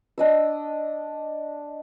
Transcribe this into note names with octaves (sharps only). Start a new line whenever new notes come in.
D4 D#5 E6